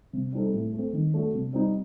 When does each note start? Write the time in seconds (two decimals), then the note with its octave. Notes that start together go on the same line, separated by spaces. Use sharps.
0.13 C3
0.33 G3 C4 D#4 A4
0.54 A2
0.73 A3 C4
0.93 D#3
1.14 A3 D4 F#4
1.34 C3
1.53 G3 C4 D#4